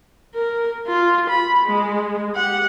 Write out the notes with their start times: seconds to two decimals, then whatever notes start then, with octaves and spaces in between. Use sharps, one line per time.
0.35 A#4
0.87 F4
1.30 B5
1.66 G#3
2.35 G4 F#5